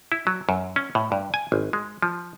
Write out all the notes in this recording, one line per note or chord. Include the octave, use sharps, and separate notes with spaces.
E4
F#3
F#2
C#4
A2
G2
G#5
G#1
G#3
F3